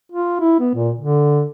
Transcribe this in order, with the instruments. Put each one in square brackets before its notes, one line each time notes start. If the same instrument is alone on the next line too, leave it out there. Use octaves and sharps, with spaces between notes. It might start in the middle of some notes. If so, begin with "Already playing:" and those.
[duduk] F4
E4
B3
A#2
D3